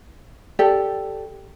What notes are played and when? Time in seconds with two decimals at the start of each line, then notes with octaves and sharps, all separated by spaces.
0.59 G4 A4 D5